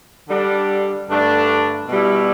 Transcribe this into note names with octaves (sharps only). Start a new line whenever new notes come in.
D3 G3 D4
G2 D3 A3 D4
B2 G3 E4